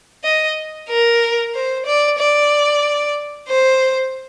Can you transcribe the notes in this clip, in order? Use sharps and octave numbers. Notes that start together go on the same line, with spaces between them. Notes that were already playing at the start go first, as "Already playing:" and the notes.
D#5
A#4
C5
D5
D5
C5